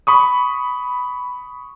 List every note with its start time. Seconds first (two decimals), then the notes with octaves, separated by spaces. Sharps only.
0.07 B5 C#6 D#6